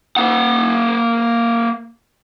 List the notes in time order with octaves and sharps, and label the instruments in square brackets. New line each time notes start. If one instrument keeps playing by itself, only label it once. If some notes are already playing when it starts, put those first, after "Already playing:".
[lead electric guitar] A#3 F#5